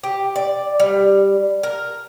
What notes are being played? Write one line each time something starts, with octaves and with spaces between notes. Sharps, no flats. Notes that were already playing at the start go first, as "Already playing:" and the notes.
G4
D5
G3
A#4